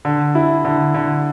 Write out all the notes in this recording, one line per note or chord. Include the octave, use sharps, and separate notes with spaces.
D3
E4
D3
D3